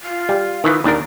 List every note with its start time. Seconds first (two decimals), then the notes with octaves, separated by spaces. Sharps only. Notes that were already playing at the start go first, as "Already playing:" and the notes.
0.02 F4
0.29 G3
0.64 D#3 E3
0.84 D#2 D4 A#4